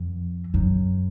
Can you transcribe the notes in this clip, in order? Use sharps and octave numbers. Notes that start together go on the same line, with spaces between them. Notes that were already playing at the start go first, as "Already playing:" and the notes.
Already playing: F2
F#2